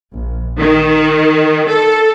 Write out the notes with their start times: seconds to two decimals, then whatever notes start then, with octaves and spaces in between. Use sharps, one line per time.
0.12 A#1
0.59 D#3
1.67 A4